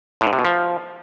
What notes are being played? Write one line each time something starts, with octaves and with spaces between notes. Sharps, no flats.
A2
G#2
C3
B2
F3